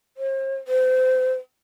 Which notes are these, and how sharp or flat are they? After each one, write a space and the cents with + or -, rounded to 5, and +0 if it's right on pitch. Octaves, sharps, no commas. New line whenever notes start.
C5 +45
C5 -30